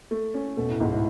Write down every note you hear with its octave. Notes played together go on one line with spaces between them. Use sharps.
A3
C#4
B2 A3
A2
C#2 G#2
A2